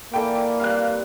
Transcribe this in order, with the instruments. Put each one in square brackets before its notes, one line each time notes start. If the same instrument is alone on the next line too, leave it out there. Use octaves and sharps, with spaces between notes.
[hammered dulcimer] E3 D5 B5 [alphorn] A#3 [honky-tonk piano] A4 G5
[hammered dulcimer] G3 C4 G4 [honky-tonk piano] F5 F#6